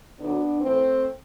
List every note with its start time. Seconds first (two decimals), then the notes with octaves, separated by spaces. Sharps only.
0.19 D2 D3 F#3 B3 D4
0.60 A2 E3 A3 C4